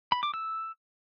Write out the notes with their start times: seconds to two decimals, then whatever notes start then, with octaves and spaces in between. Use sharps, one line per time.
0.12 B5
0.23 D6
0.34 E6